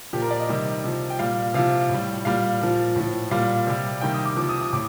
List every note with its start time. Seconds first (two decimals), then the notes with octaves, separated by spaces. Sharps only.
0.13 A#2 F3 G4
0.22 A#4
0.31 D5
0.40 D#5
0.49 C3 D#3 G3
0.84 C3 F3
1.10 G5
1.19 A#2 G3 F5
1.54 C3 F3 F5
1.89 A2 G3
2.25 A#2 G3 F5
2.61 A#2 F3
2.96 A2 F3
3.31 A#2 G3 F5
3.67 C3 G3
4.01 C3 D#3 G3 G5
4.14 D#6
4.25 D6
4.37 F3 D6
4.42 C3
4.49 D#6
4.61 D#6
4.73 A2 D6